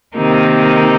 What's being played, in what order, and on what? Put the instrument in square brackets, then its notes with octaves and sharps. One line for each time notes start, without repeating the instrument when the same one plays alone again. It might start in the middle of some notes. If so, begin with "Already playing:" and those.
[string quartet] C3 D#3 A#3 D#4